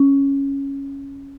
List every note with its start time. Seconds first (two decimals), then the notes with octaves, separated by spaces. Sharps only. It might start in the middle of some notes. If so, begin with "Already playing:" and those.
Already playing: C#4